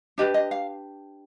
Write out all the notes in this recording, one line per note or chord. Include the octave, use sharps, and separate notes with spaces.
D4 G4 B4 D#5
D#5
F5